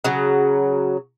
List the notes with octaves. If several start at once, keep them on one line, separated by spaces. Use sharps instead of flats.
C#3 F#3